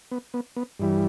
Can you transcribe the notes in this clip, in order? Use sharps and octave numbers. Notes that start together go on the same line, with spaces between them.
B3
B3
B3
G2 E3 G3